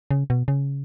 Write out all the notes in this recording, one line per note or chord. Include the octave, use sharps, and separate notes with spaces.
C#3
B2
C#3